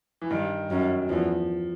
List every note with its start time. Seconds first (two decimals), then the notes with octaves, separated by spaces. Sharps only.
0.22 E3
0.31 G2 D#3
0.70 F#2
1.02 F#3
1.09 E2 F3